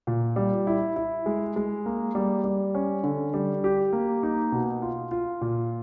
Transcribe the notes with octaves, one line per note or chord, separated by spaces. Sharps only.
A#2
G3
E4
E4
G#3
G#3
A#3
G3
G3
C#4
D3
G3
G4
A#3
D#4
B2
F4
F4
A#2